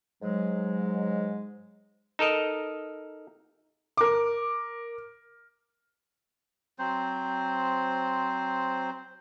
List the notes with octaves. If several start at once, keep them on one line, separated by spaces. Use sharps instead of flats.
G#2 F#3 G#3
D#4 A4 A#4 D#5
A#4 D6
F#3 C4 C5